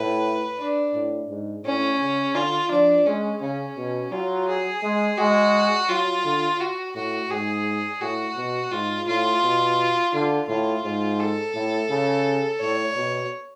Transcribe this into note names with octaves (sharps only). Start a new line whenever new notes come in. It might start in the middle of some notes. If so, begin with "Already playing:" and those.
Already playing: A2 B4
D4
A2
G#2
A2 C#4
C#3
D3 F4
F3 D4
G#3 C#4
C#3 C#4
B2
F#3 F4
G#4
G#3
G#3 F#4
F#3 F4
D3
F#4
A2 F#4
G#2 G#4
A2 F#4
B2
G#2 F4
A2 F4
B2
D3 F4
A2 F4
G#2
A4
A2
C#3
A2 C#5
B2